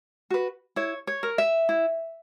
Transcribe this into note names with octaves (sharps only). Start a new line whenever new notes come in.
F#4 B4
E4 C#5
C#5
A#4
E5
E4